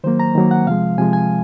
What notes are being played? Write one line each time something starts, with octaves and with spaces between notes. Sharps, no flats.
D#3 F#3 A#3 C5
A#5
D#3 F#3 A#3
F#5
C3 F3 G#3 F5
C3 F3 G#3 G#5
G#5